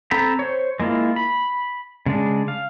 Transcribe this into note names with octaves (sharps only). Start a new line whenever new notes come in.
C4 A4 G5 A#5 B5
C5 C#5
G#3 A#3 E4 F4
B5
C#3 G#3 D4
F5